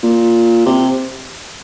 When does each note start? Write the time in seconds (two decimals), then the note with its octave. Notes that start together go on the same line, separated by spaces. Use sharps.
0.03 A#2
0.66 C3